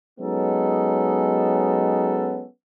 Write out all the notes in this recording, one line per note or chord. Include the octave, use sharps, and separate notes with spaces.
F#3 G#3 B3 C#4 D#4 A4